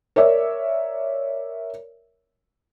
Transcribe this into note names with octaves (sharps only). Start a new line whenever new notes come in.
A#4 C#5 D5 E5